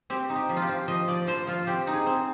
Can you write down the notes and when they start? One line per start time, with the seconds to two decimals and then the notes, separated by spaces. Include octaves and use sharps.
0.10 C4 G4
0.30 D#4
0.36 G4
0.49 F3
0.57 F4
0.62 G4
0.69 F3
0.88 F3 D#5
1.08 F3 D5
1.27 F3 C5
1.47 F3 F4
1.67 C4 G4
1.87 D#4
1.93 G#4
2.07 C4